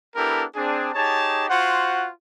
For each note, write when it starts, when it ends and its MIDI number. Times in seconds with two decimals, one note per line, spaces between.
0.16 0.44 59
0.16 0.44 62
0.16 0.44 64
0.16 0.44 67
0.16 0.44 69
0.16 0.44 70
0.55 0.90 60
0.55 0.90 62
0.55 0.90 68
0.94 1.48 63
0.94 1.48 67
0.94 1.48 68
0.94 1.48 73
0.94 1.48 81
1.48 2.08 65
1.48 2.08 66
1.48 2.08 72
1.48 2.08 78